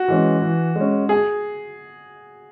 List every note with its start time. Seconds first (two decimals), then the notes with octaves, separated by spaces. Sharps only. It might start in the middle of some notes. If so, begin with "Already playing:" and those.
Already playing: F#4
0.08 E3 G#3 C#4
0.42 E3
0.76 G#3 C#4
1.09 G#4